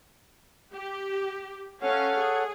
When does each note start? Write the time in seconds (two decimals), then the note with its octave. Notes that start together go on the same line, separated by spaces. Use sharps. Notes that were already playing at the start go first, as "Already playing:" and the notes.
0.71 G4
1.83 C#4 A4 C#5 F5 F#5
2.18 G#4